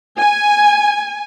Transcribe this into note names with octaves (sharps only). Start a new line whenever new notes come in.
G#5